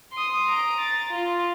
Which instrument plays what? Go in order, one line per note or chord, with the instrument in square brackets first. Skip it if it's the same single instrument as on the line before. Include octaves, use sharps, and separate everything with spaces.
[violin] C6 D#6
A#5 D7
A6
F4